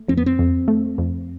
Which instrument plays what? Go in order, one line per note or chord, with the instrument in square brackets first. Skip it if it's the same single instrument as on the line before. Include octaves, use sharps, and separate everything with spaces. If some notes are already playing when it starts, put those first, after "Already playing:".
Already playing: [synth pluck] A3
[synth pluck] F2 [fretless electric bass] C4
[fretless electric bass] B3
C4
[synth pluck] F2
A3
F2